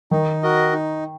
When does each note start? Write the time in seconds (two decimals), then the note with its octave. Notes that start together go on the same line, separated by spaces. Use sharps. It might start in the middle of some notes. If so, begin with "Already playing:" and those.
0.11 D#3 D#4
0.43 F#4 A#4 D#5
0.73 D#4